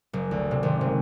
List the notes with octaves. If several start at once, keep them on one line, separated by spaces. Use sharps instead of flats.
F#1
D2
C3
G#1
F#1